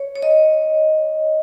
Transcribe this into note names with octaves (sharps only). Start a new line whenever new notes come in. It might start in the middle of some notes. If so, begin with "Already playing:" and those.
Already playing: C#5
C#5
D#5